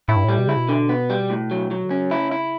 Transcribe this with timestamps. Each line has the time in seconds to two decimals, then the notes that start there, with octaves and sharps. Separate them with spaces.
0.08 A2 E4
0.16 G2
0.24 A2 G3
0.39 B2
0.47 C#3 E4
0.57 B2
0.69 D3
0.89 B3
1.10 G3
1.30 A2
1.51 F#3
1.71 F#3
1.84 D3
1.90 C#3 C#4
2.11 E4
2.31 E4